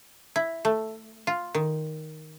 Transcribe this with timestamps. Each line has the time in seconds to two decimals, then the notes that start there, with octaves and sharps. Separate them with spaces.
0.36 E4
0.65 A3
1.27 F4
1.55 D#3